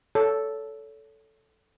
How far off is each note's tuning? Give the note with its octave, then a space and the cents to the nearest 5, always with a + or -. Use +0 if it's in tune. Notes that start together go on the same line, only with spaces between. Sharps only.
A4 +0 C#5 +30